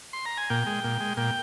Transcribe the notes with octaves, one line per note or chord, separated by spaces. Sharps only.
C6
A#5
G#5
A#2 G5
G#3
A#2
G#3
A#2 G5